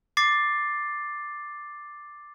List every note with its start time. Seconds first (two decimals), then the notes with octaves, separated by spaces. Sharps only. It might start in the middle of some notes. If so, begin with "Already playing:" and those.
0.17 D6 A6 C7